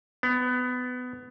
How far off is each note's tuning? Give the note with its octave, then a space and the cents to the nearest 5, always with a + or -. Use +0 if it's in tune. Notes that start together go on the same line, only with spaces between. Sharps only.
B3 +20